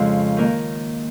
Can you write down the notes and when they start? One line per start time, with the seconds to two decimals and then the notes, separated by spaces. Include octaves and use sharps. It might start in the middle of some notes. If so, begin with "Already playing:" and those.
Already playing: F2 C#3 G#3
0.37 D#3 A#3 D#4 A#4